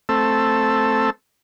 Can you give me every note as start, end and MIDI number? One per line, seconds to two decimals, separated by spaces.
0.09 1.10 57
0.09 1.10 60
0.09 1.10 69
0.09 1.10 88